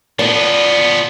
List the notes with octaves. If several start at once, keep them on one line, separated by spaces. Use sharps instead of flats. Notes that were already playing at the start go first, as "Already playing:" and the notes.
F3 B3 D5